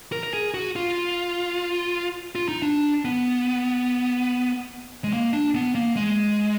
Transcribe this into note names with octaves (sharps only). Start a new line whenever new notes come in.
A#4
A#4
G#4
F#4
F4
F4
D#4
D4
B3
G#3
A#3
D4
B3
A#3
G#3